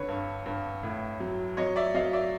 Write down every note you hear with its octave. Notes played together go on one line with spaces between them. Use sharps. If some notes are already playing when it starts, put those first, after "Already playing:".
Already playing: D3 B4 C#5
G2
G2
A2
F#3
F#3 C#5 D#5
D5 E5
F#3 D#5 F5
D5 E5